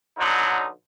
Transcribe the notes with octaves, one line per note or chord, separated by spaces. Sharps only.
B1 D3 F#3 D#4